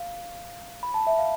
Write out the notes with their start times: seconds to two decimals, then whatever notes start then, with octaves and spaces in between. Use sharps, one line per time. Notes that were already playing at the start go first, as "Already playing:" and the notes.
Already playing: F5
0.83 B5
0.94 A5
1.07 E5
1.19 F5